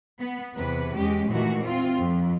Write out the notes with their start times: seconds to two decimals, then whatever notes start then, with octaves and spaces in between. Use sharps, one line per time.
0.20 B3
0.55 E2 C3 B4
0.94 E2 G#3 C#4 G4
1.27 A#2 D#3 E3 A3 F#4
1.61 C4 F4
1.97 F2